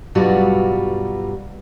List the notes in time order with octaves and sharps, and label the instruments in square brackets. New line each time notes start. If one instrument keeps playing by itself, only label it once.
[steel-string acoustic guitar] G2 B2 F#3 G3 F4 F#4